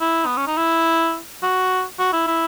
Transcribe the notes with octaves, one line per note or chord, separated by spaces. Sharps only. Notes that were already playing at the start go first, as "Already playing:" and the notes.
E4
B3
C#4
D#4
E4
F#4
F#4
E4
E4